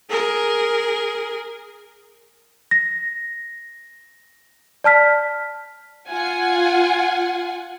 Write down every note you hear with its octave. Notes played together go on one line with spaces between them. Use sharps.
G#4 A#4
A#6
D5 A5 F6 B6
F4 F#5 G#5